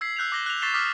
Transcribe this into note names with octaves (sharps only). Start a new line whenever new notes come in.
E6 G#6 B6 C7
E6 F#6 G6 C7 F7
D6 A#6 G7
F#6 F7
C#6 A6 B6 C7 E7 G7
D6 D#6 F6 B6